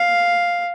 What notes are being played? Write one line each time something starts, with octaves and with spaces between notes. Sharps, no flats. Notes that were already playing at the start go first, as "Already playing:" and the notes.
Already playing: F5